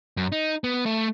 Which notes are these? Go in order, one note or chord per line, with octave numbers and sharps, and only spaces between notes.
F#2
D#4
B3
A3